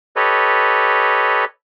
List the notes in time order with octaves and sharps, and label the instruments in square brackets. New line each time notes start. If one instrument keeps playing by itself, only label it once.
[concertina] G4 A4 B4 C#5 D#5